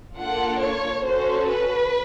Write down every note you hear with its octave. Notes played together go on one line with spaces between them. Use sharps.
A#3 D4 F4 A4 F#5
C#5
C#4 F#4 A4 C5
B4